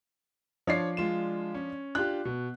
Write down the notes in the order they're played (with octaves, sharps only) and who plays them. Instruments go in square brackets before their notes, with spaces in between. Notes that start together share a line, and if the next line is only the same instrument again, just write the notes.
[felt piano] F3 D4 C7 [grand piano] C#5 D5
[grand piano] G#3 F4 E7
C#4
[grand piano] D4 F4 G4 [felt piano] F#6
[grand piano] B2